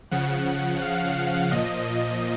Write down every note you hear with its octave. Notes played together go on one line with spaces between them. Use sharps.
C#3 F3 F#5
F5
A#2 F3 D#5